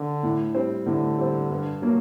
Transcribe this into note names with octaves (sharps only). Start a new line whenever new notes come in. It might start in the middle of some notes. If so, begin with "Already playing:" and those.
Already playing: D3
A2
G3 C4
A2 D3
G3 C4
G2
F#3 A#3 F#4